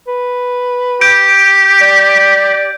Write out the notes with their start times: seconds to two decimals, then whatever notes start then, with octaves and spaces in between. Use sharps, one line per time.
0.08 B4
1.01 G4 G6 D7
1.81 D5